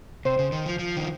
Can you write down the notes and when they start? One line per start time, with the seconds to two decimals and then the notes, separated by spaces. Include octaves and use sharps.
0.25 C3 C5
0.39 C#3
0.52 D#3
0.66 F3
0.79 F3
0.96 D#3